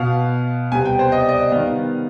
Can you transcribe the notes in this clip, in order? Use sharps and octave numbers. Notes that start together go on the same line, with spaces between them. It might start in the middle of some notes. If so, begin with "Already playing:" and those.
Already playing: B2 B3 F5
C3 G3 B3 G#5
G5
C5
D#5
D5
D#5
D#3 G3 B3 F5